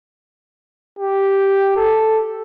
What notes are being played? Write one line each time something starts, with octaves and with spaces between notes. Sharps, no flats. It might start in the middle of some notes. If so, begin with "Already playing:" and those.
G4
A4